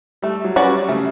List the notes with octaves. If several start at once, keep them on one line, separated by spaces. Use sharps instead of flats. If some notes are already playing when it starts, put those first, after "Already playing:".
G3 A3
F#3
C#4 F#4 B4 D5
G3
C#3 A3